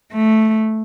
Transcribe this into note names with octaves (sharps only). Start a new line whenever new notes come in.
A3